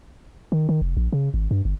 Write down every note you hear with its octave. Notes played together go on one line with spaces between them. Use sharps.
D#3
D#3
F1
A#1
C#3
G#1
G2
G1